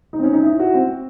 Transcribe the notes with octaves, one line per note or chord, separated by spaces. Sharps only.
D#4
C4
C#4
D#4
E4
F#4
C4